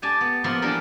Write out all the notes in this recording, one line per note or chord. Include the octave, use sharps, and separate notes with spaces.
G4 D5 G#5 A5
B3
F3 A#3 B3 E5 C6
E3 G3 D4 G4 A#4 B5